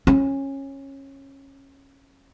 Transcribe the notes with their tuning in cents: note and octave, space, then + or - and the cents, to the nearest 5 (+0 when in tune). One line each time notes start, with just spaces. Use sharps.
C#4 -20